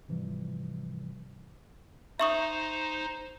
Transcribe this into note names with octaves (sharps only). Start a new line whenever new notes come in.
G#2 C3 E3 F3 G3
D#4 C5 E5 C#6 D#6